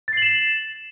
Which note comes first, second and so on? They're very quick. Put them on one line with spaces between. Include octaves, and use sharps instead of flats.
A6 C7 F#7 E7